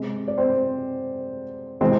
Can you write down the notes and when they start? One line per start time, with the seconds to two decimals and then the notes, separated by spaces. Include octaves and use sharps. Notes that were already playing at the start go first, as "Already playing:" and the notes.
Already playing: C3 G#3
0.28 D5
0.38 C4 C5
1.81 C3 E3 G#3 C4 C5